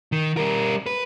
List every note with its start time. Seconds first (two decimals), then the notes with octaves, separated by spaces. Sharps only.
0.12 D#3
0.37 G3 A#4
0.86 B4